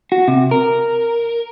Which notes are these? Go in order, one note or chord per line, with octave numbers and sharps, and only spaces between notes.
F#4
C3
A#4